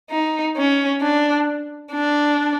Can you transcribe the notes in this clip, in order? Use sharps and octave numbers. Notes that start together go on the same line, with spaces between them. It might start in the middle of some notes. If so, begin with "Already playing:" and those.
D#4
C#4
D4
D4